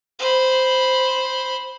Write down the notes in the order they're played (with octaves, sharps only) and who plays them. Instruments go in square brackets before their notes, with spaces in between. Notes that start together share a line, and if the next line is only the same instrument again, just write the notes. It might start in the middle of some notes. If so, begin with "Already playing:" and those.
[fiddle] C5 B5